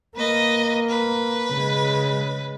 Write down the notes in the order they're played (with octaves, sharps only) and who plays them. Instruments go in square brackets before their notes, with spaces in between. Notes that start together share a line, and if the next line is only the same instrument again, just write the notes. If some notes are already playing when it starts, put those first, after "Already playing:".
[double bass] A#3 [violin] B4 D#5
[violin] B4
[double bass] C#3 G#3